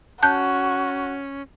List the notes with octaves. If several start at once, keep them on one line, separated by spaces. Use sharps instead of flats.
C#4 F#4 A5 F#6 G6